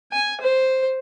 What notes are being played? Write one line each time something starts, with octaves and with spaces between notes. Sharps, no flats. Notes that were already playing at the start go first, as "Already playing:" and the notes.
G#5
C5